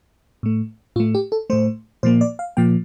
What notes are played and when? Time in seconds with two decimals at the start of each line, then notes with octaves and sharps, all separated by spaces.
0.43 A2 A3
0.96 A2 F4
1.00 A3
1.15 G4
1.32 A4
1.50 A2 A3 C5
2.03 A#2 F3 A#3 C5
2.21 D5
2.39 F5
2.57 A#2 F3 A#3 G5